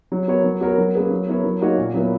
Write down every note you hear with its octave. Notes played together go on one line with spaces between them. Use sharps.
F#3
B3 F#4 A#4 C#5
F#3
B3 F#4 A#4 C#5
F#3
A#3 C#4 G#4 B4
F#3
B3 E4 A#4 C#5
F#3
A#3 D#4 F#4 C#5
A#2
F#3 B3 E4 B4